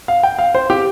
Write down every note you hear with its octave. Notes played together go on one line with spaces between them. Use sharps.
F5
G5
F5
C5
G4